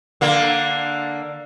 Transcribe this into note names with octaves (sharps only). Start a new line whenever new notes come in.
D3 A#3